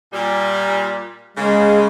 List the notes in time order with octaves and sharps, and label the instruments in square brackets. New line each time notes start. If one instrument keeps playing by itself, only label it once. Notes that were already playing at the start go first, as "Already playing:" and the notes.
[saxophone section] A#2 G3
[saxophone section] C#3 A#3 [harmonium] G#3